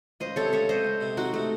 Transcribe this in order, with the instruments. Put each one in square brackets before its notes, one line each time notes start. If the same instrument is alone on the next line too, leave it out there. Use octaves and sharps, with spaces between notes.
[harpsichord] C#2 [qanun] C5 D#5
[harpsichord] C3 [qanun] A4 C#5
[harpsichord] C#2 [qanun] C#5 E5
[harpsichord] C#2 [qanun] C5 D#5
[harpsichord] C#2
C3
[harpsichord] C4 [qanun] D#4 F#4
[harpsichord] C3 [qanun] A3